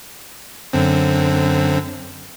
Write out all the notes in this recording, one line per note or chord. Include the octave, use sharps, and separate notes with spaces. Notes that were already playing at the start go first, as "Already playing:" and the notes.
F#2 D3 C4